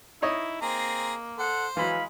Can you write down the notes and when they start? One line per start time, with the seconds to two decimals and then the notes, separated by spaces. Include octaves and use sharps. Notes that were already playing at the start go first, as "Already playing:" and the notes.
0.22 D#4 E4 C#5 D#5
0.62 A#3 C4 G#4 A#5
1.38 A4 C5 F#5
1.77 E3 F#3 G#3 F5 B5